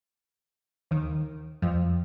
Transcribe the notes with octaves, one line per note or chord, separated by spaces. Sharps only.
D#2 D#3
F2 F3